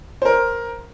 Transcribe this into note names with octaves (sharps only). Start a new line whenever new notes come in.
A#4 C5